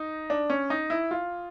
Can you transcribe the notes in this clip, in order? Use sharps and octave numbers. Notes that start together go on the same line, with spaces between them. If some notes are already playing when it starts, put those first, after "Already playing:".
Already playing: D#4
D4
C#4
D#4
E4
F4